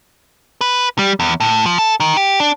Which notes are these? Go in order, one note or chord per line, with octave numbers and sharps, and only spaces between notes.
B4
G3
E2
A2
F3
A4
D#3
G4
D4